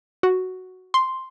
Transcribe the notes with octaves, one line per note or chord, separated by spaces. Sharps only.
F#4
C6